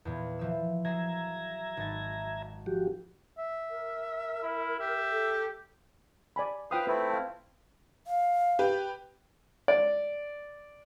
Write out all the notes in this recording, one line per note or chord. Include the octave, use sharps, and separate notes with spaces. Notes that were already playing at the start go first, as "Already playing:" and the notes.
E2 A#2
E3 F3 E6
F#3 G#4 E5 A#5 E6 G#6
G#1 A6
F3 F#4 G4
E5
A#4
E4
G4 E5
A4
D5 G#5 B5
F4 B4 C5 F5 G5 D#6
A3 C4 E4 B4 B5
F5 A5
F5
G4 B4
D5